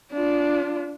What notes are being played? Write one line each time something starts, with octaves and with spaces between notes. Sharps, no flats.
D4 F4